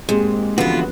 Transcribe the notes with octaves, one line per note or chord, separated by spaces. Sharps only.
G#2 G#3 A#3 C4 G4
E2 D3 F3 B3 C#4 F4 F#4 B4